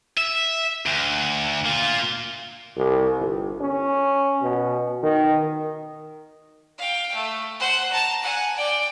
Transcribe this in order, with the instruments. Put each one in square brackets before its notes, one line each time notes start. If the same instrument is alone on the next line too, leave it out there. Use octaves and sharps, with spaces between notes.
[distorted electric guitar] E5
D2
A#3 F4
[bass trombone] C2
G1
C#4
B2
D#3
[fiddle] F5 G5
A3
C5 F#5
A5 A#5
F#5 G#5
D5 G5